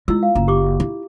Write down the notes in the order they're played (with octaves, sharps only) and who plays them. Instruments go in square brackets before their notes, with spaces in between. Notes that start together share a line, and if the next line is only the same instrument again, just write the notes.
[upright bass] G#3 [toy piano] E4 F4 E6
[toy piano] F5
[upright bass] F#1 [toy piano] A#5
[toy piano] G4 C#6 D6
[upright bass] E4